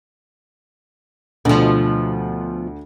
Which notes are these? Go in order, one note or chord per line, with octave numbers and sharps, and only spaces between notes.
D2 B2 F3 A3